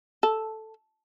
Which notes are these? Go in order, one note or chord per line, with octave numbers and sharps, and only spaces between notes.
A4